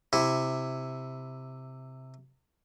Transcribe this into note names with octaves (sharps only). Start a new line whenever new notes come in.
C3 E4